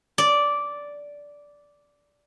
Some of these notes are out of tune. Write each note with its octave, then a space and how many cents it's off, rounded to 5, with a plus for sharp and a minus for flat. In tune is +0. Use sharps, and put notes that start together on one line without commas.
D5 -10